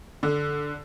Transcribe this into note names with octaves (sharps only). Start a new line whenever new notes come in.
D3